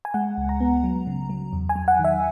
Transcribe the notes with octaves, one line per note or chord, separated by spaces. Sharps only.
G#5
G#3 F#5
C#2
A#5
B3
F#3
C#3
F#3
E2
G#5
F#3
F#5
D#3
E5